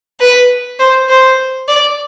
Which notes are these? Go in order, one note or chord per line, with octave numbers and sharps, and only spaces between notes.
B4
C5
C5
D5